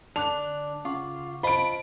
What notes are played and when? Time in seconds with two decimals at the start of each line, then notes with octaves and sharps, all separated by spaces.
0.16 D3 D4 A5 D6 F#6 F7
0.85 C#3 F4 F#5 C#6 D6
1.43 F4 C5 D#5 A5 B5 D7